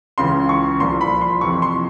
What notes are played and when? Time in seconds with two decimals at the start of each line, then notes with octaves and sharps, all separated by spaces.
0.18 C#2 C#3 E3 C6
0.49 C#6
0.80 C2 A#2 F3 C6
1.01 B5
1.21 C6
1.41 F2 C3 E3 C#6
1.62 C6